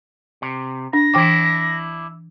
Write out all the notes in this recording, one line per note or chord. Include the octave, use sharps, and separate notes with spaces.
C3
D4 A#6
E3 D4 E4 G5 D6